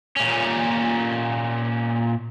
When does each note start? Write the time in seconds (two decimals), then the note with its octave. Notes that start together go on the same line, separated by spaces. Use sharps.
0.17 A#2 C#4